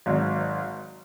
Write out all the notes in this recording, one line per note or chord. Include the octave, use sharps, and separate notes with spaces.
G#1 G#2 F#3